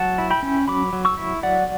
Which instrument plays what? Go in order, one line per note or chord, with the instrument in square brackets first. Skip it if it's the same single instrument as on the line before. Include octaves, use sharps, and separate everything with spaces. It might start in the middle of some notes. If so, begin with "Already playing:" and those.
Already playing: [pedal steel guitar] F#3 F#5 A5
E4
G5 B5
C#4
F#3 B5 D6
F#3
C#6 E6
E4
F#3 D5 F#5